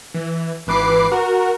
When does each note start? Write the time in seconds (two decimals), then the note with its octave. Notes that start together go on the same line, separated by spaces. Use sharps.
0.14 E3
0.67 G#1 E3 B4 D6 C7
1.11 F#4 A#4